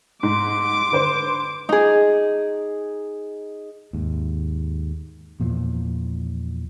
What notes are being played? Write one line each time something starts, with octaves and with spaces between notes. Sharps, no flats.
G#2 C6 D6
D3 B4 C5
D#4 G#4
D#2 G#2
E2 A#2 E3 F3